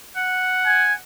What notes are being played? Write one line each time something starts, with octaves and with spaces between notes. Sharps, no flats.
F#5
G#5